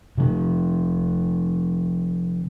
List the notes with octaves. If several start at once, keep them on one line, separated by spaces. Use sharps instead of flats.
C3 F3